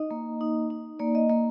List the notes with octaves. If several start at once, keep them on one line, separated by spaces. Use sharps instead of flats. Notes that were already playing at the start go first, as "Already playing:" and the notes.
Already playing: D#4 D#5
A#3
D#4
D#4
A#3 D5
D#5
A#3 D#5